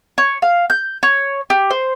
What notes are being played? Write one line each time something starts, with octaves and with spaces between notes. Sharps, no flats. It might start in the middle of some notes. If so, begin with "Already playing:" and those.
C#5
F5
G6
C#5
G4
C5